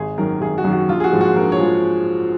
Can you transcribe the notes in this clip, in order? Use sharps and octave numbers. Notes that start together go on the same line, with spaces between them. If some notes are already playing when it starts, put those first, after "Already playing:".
Already playing: G#1 G#4
F#2 D#3 F#3 A#4
G#1 G#4
F#4
F#2 D#3 F#3
F#4
A#1 F4
G#4
F#4
G#2 F3 G#3
F#4
A#1 A#4
C#5
F3 G#3